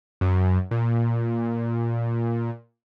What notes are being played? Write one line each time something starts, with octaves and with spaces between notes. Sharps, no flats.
F#2
A#2